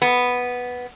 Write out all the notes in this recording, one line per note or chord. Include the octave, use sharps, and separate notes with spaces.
B3